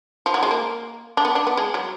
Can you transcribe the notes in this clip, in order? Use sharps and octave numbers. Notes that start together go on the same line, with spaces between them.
F3
F#3
G#3
A#3
D4
B3
D4
B3
G#3
F#3